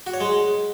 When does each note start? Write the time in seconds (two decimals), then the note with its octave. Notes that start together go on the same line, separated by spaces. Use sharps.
0.07 F#4
0.14 C#5
0.21 G#3